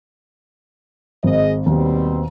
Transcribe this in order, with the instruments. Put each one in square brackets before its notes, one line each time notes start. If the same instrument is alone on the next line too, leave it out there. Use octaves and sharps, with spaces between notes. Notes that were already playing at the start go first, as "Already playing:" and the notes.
[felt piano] G#1 [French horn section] G#4 D#5
[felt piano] D#2 [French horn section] B2 G3 C4